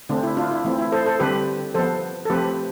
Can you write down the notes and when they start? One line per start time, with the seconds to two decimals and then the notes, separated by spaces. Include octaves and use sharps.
0.09 D3 A3 C4 D4
0.23 E4
0.37 D4 F4
0.51 E4
0.65 E3 A3 C4
0.78 E4
0.92 A4 C5
1.06 A4 C5
1.19 D3 G3 C4 G4 B4
1.74 F3 B3 A4 C5
2.25 A4
2.30 F3 A3 C4 G4 B4